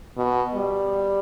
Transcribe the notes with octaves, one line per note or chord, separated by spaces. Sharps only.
B2
G3